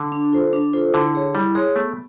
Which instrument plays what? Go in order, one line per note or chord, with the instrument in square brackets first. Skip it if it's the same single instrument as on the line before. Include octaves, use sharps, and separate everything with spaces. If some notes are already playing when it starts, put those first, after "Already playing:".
Already playing: [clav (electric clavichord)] D3
[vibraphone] D4
F4 A4 C5
D4
F4 A4 C5
[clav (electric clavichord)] D3 [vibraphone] E4
[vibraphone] G#4 C#5
[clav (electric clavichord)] G3 [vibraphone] E4
[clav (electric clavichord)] G#3 [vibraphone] G#4 C#5
[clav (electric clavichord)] A3 [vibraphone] B3